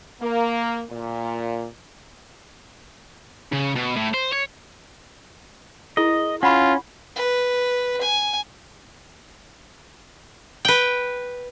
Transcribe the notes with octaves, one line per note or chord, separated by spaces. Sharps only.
A#3
A#2
C#3
B2
A2
C5
C#5
E4 G#4 A#4 D#5
C#4 F4 F#5 B5 C#6
B4
G#5
B4 G5